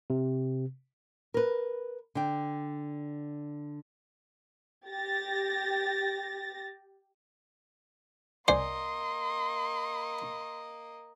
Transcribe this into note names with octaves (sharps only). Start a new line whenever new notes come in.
C3
A#4 B4
D3 G5
G4 A6 A#6
C2 A#3 C5 D5 D#5 G#5 C6